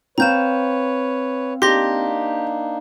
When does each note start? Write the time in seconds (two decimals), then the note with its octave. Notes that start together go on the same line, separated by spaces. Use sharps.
0.18 C4 B4 C#5 F5 A#5 G6 E7
1.62 A#3 D4 D#4 G4 C6 A#6 G7